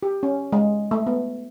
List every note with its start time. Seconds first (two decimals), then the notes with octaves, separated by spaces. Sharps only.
0.03 G4
0.23 C#4
0.52 G#3
0.91 A3
1.07 B3